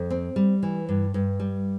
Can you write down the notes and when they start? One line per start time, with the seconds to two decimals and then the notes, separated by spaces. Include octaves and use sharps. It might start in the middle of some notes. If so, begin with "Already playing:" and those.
Already playing: F2
0.10 C4
0.36 G3
0.63 E3
0.89 G2
1.14 G2
1.40 G3